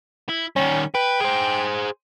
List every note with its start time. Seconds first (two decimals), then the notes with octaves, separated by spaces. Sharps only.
0.29 E4
0.56 D#3 G3 C#4
0.95 B4 G5
1.21 G#4 C5